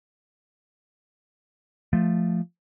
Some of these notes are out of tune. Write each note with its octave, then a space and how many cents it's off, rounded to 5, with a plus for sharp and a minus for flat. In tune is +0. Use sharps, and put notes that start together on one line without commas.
F3 +0 A3 +0